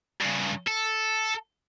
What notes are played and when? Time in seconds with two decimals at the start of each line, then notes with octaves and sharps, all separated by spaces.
0.21 G2 C#3
0.68 A4